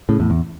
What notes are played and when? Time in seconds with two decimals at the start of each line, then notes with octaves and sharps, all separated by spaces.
0.09 A2 C#3
0.19 E2 A2
0.30 E2